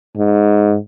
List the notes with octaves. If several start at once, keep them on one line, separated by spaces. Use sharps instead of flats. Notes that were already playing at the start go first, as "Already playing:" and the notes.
G#2